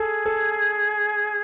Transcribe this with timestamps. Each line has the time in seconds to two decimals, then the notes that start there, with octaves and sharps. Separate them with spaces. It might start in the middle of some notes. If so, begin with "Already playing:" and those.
Already playing: G#4 A4
0.26 A4